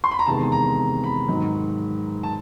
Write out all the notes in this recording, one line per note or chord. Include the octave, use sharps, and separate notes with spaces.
C6
B5
A#5
E2 C3 D#3 G#3 A5
A#5
B5
G#2 D#3 F#3
A5